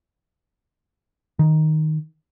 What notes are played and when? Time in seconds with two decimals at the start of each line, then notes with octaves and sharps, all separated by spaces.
1.39 D#3